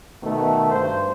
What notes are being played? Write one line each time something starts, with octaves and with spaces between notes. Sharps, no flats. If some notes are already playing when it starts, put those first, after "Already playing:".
B2 D#3 A3
G2 C5